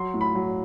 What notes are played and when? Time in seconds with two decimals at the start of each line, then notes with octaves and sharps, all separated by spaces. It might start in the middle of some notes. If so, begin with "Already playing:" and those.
Already playing: F#3 C6
0.14 A2
0.21 B5
0.35 F#3